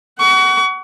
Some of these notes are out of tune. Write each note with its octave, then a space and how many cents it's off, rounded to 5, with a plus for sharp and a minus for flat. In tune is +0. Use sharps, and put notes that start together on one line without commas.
F#5 +25 C#6 +35